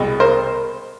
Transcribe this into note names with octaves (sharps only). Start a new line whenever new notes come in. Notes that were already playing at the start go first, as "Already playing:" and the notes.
Already playing: C2 B2 G#3
A#4 C5